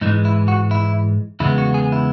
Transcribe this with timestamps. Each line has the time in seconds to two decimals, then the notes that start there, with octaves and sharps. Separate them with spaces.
0.01 G#2 E3 G#3 D#4
0.25 E4
0.48 F#4
0.71 E4
1.40 E2 C#3 G#3 B3 E4
1.58 F#4
1.74 G#4
1.92 E4